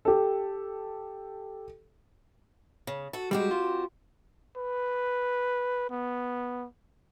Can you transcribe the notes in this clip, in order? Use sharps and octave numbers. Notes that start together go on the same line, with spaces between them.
G4 A4
C#3
F#4 A4
G3 G#3 C4 F#4 G4
F4
B4
B3